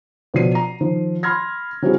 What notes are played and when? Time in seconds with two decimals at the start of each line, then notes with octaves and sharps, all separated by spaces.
0.34 B2 F3 F#3 D5 C7 D#7
0.55 A#5
0.80 D#3 F3
1.23 B5 C6 F6 G#6 A#6
1.82 F#3 G3 C4 E4 F#4 G#4